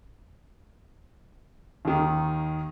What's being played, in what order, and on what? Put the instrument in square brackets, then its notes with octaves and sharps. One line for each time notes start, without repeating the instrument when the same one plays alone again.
[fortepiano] D#2 D#3